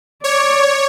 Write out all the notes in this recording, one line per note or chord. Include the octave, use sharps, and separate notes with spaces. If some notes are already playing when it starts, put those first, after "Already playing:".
C#5 D5